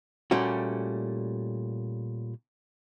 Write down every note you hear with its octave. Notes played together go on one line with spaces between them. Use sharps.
A#2 G3 A3 C#4 F#4